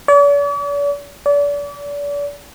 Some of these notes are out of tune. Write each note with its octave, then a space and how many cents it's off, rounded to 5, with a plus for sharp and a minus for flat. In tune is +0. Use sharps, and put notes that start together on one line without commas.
D5 -45
D5 -35